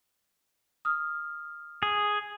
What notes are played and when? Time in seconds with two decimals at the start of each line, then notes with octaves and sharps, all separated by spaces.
0.85 D#6 F6
1.83 G#4